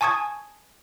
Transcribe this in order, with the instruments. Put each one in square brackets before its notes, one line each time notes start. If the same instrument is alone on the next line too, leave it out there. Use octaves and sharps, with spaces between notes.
[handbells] G#5 A5 C#6 D#6 G#6